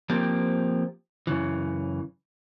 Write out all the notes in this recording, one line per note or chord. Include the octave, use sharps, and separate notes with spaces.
F3 A#3 C4 G4
F#2 C#3 E3